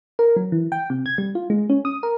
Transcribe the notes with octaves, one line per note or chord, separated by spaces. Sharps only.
A#4
F#3
E3
G5
C3
G#6
G3
F4
G#3
C#4
D#6
A#4